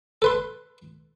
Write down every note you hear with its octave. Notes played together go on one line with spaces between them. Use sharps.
A4 B4 C6